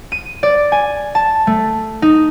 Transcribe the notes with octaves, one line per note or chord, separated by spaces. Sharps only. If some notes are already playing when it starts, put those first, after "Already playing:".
D#7
D5
G#5
A5
A3
D#4